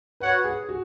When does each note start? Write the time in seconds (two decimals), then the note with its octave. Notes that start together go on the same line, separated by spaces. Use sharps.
0.20 F#4 B4 C#5 F#5
0.44 G#4
0.69 F#4